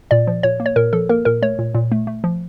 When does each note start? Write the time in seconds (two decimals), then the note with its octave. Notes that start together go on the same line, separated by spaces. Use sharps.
0.11 A#2 D5
0.27 F3
0.43 A#2 C#5
0.60 A#3
0.66 C#5
0.76 A#2 A#4
0.93 F3 A4
1.09 A#3 A#4
1.25 A#2 A#4
1.42 A3 C#5
1.59 A#2
1.75 A#2
1.92 A3
2.07 A3
2.24 F3